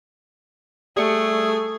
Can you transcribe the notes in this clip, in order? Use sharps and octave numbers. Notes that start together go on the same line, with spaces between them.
G3 A3 G#4 C#6